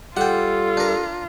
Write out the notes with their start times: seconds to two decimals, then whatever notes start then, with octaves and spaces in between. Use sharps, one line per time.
0.17 G3 F4 A4 F#5 G5
0.77 D4 A#4